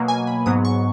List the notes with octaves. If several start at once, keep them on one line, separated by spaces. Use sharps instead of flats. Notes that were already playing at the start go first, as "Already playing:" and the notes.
Already playing: B2 F#3 A#3
G#5
B5
G#2 F#3 B3 D#6
C#6